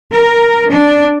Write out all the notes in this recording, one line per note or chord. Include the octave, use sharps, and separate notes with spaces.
A#4
D4